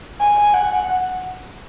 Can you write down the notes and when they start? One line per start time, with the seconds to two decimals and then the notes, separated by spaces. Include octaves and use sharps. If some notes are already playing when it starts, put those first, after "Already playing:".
0.21 G#5
0.54 F#5